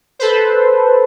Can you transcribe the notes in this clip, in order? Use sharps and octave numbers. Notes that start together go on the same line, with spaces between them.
A4 B4 C5